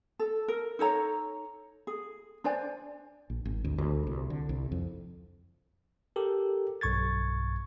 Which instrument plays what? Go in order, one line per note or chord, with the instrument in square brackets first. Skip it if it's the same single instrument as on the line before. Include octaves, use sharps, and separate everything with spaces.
[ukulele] A4
A#4
D#4 A4 C#5 A#5
G#4
D4 C5 D5 G#5
[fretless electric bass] A#1
G#1
D2
D2
C2
D3
C2
F2
[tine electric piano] G4 A4 A#4
B1 G2 C#6 G#6 A6